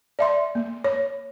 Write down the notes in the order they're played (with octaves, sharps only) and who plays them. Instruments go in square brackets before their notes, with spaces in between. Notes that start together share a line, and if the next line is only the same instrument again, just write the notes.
[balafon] D5 E5 C6
A#3
C#5